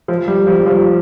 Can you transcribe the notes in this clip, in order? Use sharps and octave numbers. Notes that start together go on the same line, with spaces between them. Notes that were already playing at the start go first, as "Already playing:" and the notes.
F3
G3
F3
G3
F3